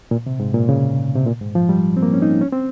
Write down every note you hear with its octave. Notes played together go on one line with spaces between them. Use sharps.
A#2
C3
G#2
A#2
C#3
C3
A#2
G#2
F3
G3
C4
A#3
C#4
D#4
C#4
C4